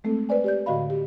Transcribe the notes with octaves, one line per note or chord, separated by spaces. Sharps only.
G#3 A3 C4 A4
B4 C5 D5 G#5
G4 D5 G6
A2 D3 F#4 D#5 F5 B5
G4